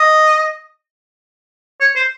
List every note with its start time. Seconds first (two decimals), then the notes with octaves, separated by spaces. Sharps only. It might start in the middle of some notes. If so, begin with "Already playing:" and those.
Already playing: D#5
1.80 C#5
1.96 C5